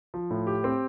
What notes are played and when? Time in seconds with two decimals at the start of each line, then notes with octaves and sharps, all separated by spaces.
0.14 F3
0.31 A2
0.47 G4
0.64 C4